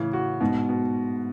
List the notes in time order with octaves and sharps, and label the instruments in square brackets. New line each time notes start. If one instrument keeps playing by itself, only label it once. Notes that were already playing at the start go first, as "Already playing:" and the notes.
Already playing: [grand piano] A2 [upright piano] C#3 E3
[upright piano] F#4
[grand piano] G#2 [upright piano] B2
[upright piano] B2